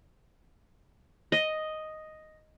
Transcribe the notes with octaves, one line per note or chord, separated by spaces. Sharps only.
D#5